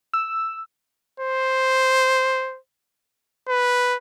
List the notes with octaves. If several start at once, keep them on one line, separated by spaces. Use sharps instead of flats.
E6
C5
B4